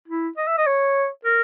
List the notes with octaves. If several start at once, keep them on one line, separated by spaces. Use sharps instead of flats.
E4
D#5
E5
D#5
C#5
A#4